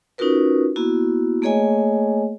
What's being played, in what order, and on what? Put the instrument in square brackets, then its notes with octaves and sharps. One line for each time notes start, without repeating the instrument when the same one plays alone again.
[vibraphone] C#4 D#4 F4 F#4 A#4 B4
A#3 B3 E4 F#4
A3 A#3 G#4 C#5 D#5 G#5